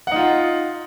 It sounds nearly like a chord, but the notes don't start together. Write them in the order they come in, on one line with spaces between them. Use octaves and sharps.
F#5 D#4 F4